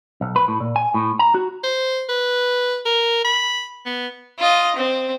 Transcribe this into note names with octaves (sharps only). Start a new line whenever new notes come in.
B1
B4
A2
A#2
G#5
A2
A#5
F#4
C5
B4
A#4
B5
B3
F4 D#5
C4